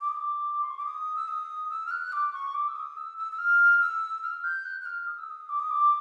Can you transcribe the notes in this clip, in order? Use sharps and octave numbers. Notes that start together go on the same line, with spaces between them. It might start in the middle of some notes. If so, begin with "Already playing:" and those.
D6
D#6
D6
C6
C#6
D6
D#6
E6
D#6
E6
F6
F#6
D6
C#6
D6
E6
D#6
E6
E6
E6
F6
E6
F6
G6
F#6
F#6
F6
D#6
E6
D#6
D6
D#6
D6